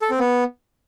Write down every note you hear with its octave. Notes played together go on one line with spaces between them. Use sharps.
A4
C4
B3